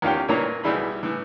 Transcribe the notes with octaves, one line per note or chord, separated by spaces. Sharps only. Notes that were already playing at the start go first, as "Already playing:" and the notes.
E2 D#3 C#4 F4 G4 G5
A#2 E3 A#3 C#5 A#5
B1 E3 G3 E4 G#4 B5
A2 E3